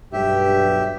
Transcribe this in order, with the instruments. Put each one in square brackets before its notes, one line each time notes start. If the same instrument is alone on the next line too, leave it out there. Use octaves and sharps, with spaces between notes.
[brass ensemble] B1 G2 F#3 [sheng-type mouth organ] G4 E5